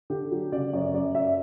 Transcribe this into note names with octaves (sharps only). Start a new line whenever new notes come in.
D3 G4
F#3
C#3 D5
F#2 C#5
F#2 D5
F#2 E5